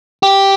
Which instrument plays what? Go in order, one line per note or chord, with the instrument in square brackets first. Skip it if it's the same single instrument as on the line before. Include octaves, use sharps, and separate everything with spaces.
[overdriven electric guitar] G4